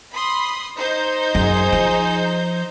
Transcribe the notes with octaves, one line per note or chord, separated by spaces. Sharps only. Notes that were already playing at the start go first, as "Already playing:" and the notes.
B5 C6 D#6
D#4 C5 G6
F#2 G#4
F3